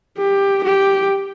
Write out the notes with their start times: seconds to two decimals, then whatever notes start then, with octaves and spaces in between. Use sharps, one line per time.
0.18 G4
0.64 G4